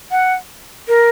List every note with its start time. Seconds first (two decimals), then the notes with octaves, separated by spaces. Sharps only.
0.11 F#5
0.88 A#4